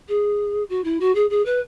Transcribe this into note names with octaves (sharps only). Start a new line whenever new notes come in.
G#4
F#4
E4
F#4
G#4
G#4
B4